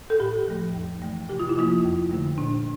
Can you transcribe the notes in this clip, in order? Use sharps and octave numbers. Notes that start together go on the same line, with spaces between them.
A4
A2 G4
F3 A3
F2
E3 A3
C3 G4
F4
E4
F3 A#3 F4
F2
D3 A3
A#2 D4